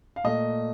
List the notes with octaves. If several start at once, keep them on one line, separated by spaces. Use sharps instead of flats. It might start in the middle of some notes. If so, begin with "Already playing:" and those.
F5
A#2 A3 D#5